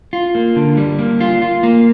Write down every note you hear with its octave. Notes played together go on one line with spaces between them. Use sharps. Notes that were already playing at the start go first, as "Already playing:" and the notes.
F4
A#3
D3
G3
A#3
F4
F4
A#3